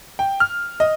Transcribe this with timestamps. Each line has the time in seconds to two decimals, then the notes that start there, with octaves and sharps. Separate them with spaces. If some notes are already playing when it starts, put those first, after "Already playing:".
0.19 G5
0.40 F6
0.80 D#5